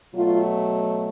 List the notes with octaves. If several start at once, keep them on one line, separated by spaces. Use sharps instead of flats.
B2 F#3 A3 F4